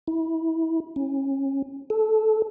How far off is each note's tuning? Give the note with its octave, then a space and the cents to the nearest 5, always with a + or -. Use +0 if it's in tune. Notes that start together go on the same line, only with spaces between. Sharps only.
E4 -25
C#4 -25
A4 -15